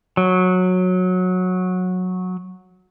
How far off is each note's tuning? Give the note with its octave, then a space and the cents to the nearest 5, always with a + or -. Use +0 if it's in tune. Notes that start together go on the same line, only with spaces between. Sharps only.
F#3 -15